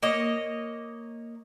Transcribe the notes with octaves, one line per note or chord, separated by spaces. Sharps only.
A#3 C#5 D#5